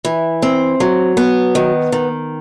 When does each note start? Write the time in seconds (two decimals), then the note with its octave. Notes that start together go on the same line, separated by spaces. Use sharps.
0.05 E3
0.42 C4
0.80 F#3
1.17 B3
1.55 D#3
1.92 D#3